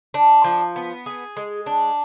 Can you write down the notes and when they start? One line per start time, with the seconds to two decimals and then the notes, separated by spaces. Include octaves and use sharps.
0.14 D4
0.44 F3
0.76 B3
1.06 G#4
1.37 G#3
1.66 D4